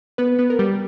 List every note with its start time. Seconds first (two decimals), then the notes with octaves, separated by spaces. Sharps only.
0.18 B3 B4
0.39 B3 B4
0.50 A#4
0.59 G3 G4